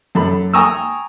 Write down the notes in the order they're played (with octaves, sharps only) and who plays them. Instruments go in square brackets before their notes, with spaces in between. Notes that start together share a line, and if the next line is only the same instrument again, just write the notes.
[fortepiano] F#2 A4 B5
G5 G#5 A#5 C#6 D#6 E6